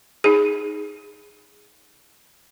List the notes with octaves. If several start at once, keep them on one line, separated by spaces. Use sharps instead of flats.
D#4 G#4